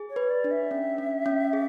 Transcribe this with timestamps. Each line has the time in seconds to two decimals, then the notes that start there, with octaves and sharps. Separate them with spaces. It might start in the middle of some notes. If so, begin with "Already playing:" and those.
Already playing: G#4
0.10 C#5
0.16 B4
0.30 D5
0.44 D4
0.51 E5
0.71 C#4
0.98 C#4
1.26 C#4
1.53 G#4